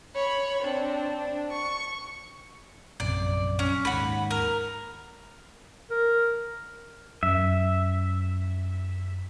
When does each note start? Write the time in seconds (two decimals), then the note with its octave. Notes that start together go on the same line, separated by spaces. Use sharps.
0.15 C#5 B5
0.63 C4 D4
1.18 D4
1.52 C#6
3.00 A#1 F#2 C3 D5
3.59 C#4
3.85 D#2 G#2 F#5 B5
4.31 A#4
5.91 A#4
7.23 F#2 E5